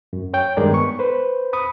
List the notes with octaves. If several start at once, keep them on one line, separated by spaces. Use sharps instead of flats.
F#2
C#5 G5
G2 D#3 G#3 G#4 A#4 D5
B3 C#6
B4 C5
B5 D#6